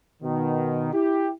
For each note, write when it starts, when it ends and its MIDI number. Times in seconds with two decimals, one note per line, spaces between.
0.23 0.90 47
0.23 0.90 51
0.93 1.31 64
0.93 1.31 67